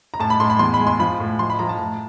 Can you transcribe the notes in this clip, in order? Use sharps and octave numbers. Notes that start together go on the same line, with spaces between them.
A#5
A2 A5
B5
A2 C6
B5
E2 C6
B5
G#3
C6
F3 B5
A2
F3 C6
B5
F3 A#5
A5
A2